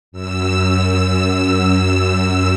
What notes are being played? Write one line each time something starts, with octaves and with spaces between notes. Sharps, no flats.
F#2 E6